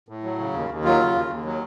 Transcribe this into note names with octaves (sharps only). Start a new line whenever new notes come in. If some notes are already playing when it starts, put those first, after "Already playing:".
A2
F#3
C#3
D#2
D#2
F#3 F4
C#3
D#2
D#2
F#3